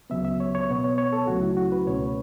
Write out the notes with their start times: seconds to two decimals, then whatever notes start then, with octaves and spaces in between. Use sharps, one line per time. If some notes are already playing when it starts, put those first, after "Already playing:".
0.10 C#2 C#3 F#3 B3 E5
0.25 E5
0.40 C#5
0.55 C#5
0.69 B2 B3
0.84 C#5
0.98 C#5
1.12 A4
1.27 C#2 C#3 F#3 A3 C#4 F#4
1.42 E4
1.57 F#4
1.72 B4
1.87 C#2 B2 A3 C#4 C#5
2.01 B4